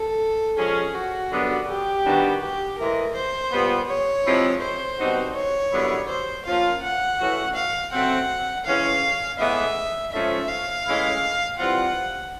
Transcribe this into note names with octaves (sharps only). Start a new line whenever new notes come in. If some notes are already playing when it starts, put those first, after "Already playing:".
Already playing: A4
F3 G#3 C#4 G#4
F#4
F#2 D3 G3 B3 D4
G4
D#3 G3 B3 D4 F#4
G4
A2 E3 G#3 A#4
C5
A#2 G3 B3
C#5
C3 F3 G#3 C4 E4
C5
B2 G3 C4 D#4 F#4
C#5
F#2 D3 G3 B3 E4
C5
F3 A#3 C#4 F4 F5
F#5
E3 A3 C#4 F#4
F5
C#3 F#3 A3 C4 F#5
E3 G#3 C#4 F5
A2 E3 G#3 B3 E5
G#2 F3 A3 C#4 E5
F5
A2 E3 G#3 C#4 E4
E3 G3 C4 F4 F#5